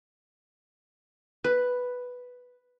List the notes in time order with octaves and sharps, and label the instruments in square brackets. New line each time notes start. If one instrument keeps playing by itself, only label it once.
[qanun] B4